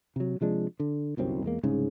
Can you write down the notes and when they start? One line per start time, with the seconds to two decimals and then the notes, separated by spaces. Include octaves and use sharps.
0.16 C3 F#3
0.41 C3 F3 G#3 D4
0.80 D3
1.17 G1 C2 F#2 C4
1.44 E2 G#3 A#3
1.63 C2 G#2 C#3